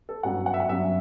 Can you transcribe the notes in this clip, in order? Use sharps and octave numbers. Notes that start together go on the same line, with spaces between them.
A4
G1 F#2 F#3 F#5
F#5
E5
F#5
G1 F#2 F#3 E5